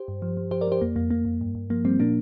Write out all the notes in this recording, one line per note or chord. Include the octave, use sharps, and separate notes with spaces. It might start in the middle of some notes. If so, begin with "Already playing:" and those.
Already playing: G4 C5
G2
F3
F3
F3 G4 C5
A#4 D5
F3 G4 C5
F2 A#3
F2 A#3
F2 A#3
F2
G2
G2
F3 A#3
F3 G3 C4
A#2 A#3 D4